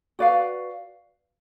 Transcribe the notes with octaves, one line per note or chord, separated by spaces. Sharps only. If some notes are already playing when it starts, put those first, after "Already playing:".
F#4 B4 D5 F5